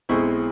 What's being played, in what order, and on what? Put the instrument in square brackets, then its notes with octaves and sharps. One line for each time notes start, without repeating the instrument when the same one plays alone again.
[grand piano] B1 B2 G#3 C4 E4 C#6